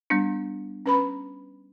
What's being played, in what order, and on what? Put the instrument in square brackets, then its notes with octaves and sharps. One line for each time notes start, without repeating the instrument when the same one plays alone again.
[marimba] G3 B3 D4
[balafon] C#4 B4 B5